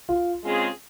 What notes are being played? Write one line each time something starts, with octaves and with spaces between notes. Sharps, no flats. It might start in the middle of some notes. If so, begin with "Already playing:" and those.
F4
C#3 G#3 C4 F4 G#4